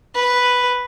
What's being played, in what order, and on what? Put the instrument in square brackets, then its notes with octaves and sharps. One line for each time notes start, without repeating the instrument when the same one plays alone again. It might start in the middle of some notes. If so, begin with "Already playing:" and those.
[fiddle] B4